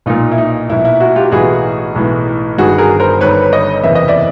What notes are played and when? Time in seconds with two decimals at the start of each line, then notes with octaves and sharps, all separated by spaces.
0.06 B1 A#2 D#4 F4
0.32 E4
0.38 D#4
0.69 B1 A#2 E4
0.85 E4
1.00 E4 F#4
1.16 F4 G4
1.32 B1 A2 E3 F#4 G#4
1.96 B1 A2 E3
2.58 G1 G2 D#3 F#4 G#4
2.78 G#4 A#4
3.00 A#4 C5
3.21 G1 G2 D#3 B4 C#5
3.52 C#5 D#5
3.83 F#1 E2 C3 E3 E5
3.95 D#5
4.08 D5 E5